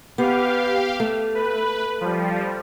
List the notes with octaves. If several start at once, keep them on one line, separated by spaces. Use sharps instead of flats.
B3 G4 F5
A3
B4
F3 G3